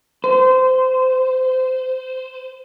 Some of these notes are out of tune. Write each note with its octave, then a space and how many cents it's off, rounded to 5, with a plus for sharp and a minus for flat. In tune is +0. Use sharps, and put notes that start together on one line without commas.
C5 -20